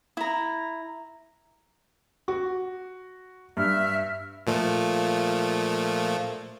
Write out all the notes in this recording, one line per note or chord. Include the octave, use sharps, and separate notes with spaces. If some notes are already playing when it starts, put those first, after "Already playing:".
E4 A#5
F#4
G2 E5 F6
A#2 F3 A3